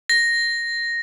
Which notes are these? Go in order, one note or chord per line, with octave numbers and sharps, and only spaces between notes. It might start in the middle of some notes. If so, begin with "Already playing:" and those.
A#6